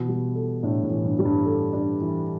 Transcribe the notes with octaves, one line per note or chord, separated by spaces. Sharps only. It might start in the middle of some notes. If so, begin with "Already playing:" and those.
Already playing: B2 E3
G3
A4
A2 D4
A2
E3
G2
G3
G2
A4
D4
E3